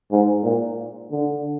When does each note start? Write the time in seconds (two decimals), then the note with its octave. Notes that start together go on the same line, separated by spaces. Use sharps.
0.11 G#2
0.44 A#2
1.11 D3